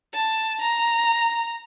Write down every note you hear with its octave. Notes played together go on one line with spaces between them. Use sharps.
A5
A#5